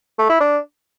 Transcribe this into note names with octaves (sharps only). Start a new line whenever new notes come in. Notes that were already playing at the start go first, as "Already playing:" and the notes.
A3
E4
D4